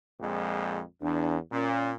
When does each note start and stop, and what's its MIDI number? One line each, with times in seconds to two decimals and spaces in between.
0.20 0.82 34
0.20 0.82 41
0.20 0.82 56
1.01 1.37 40
1.01 1.37 62
1.52 1.93 46
1.52 1.93 61